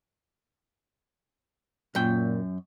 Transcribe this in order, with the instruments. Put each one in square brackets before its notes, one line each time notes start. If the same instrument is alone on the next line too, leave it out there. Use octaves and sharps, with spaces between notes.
[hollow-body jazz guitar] F#2 G5 [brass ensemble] A#2